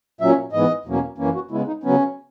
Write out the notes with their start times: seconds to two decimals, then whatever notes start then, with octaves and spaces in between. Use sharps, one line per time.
0.21 A#2 F#3 C#4 E5
0.52 G#2 E3 B3 D#5
0.86 E2 B2 F#3 A#3 C#4
1.18 F#2 E3 A#3 C#4
1.35 F#4
1.51 C#3 G#3 B3 E4
1.67 D#4
1.84 C#3 F#3 B3 C#4